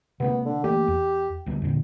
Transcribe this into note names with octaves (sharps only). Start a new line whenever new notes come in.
C3 G#3 A#3 B3
D3
E3 A3 A#3 G4
E2
D2 G3 B3
E2 A#2 D3